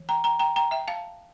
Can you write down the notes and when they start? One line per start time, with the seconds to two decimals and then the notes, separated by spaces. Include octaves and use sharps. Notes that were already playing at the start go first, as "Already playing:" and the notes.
Already playing: E3
0.09 G5 A#5
0.24 G5 A#5
0.39 G5 A#5
0.56 G5 A#5
0.71 E5 G5
0.88 F5 A5